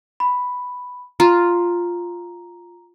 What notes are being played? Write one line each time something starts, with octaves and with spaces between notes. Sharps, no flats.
B5
F4 A#5